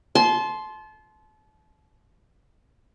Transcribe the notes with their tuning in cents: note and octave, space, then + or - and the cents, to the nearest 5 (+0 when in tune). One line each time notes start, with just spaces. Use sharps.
A5 -30 C6 +0